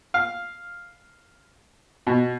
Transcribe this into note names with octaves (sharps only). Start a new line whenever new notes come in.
F5
B2